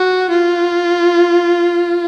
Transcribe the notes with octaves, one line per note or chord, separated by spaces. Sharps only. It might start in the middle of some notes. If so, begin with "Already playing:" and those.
Already playing: F#4
F4